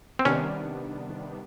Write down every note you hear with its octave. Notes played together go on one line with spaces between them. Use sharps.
C4
C3 D#3 G3 B3 C#4 D4